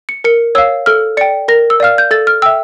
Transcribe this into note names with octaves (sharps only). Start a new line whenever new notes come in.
C#7
A#4 C#7
C#5 F5 E6
A4 F6
D5 G5 C#7
A#4 A#6
E6
D5 F5 F6
G6
A4 A6
F6
E5 G5 E6